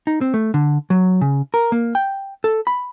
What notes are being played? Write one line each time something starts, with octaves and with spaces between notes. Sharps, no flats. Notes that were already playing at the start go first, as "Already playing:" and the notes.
D#4
C4
A3
D3
F#3
C#3
A#4
A#3
G5
A4
B5